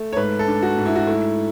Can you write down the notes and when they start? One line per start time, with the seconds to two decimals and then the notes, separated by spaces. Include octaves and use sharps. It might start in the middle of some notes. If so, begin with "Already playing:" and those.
Already playing: A3
0.12 C#5
0.17 G#2 B4
0.39 A4
0.47 D4
0.62 F#4
0.78 G#2
0.86 E4
0.96 F#4
1.07 A3 E4